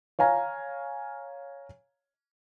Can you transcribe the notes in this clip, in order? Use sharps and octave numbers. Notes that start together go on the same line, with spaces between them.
C#5 F5 G#5 A#5